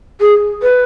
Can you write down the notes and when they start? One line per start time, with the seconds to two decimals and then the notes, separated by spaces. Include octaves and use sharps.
0.21 G#4
0.63 B4